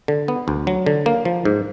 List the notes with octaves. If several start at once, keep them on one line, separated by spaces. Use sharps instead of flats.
D3
B3
D2
F#3
D3
A#3
F3
G#2